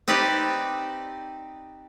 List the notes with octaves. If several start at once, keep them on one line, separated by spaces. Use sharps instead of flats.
C4 D#4 G4 B4 D5